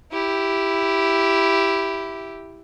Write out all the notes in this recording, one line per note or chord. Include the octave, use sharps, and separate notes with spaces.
E4 G4